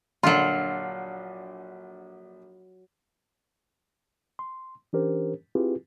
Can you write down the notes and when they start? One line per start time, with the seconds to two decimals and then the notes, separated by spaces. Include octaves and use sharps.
0.23 A#1 D3 F#3 F4 C6
4.39 C6
4.93 E3 C#4 D4 G4 A#4 C5
5.55 C4 E4 F4 G4 G#4 B4